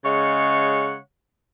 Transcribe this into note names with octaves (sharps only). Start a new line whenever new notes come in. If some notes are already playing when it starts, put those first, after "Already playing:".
C#3 G#3 C#5 F5 F#5